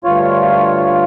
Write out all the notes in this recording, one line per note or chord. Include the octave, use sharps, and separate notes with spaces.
D2 G2 F4 C#5